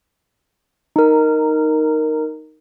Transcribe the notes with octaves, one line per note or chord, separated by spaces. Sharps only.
D#4 A#4